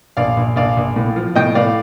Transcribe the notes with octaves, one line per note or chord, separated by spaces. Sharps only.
A#1 D5 F5
A#1
A#1 D5 F5
A#1
A2
F3
A2 D#5 G5
A2 D5 F5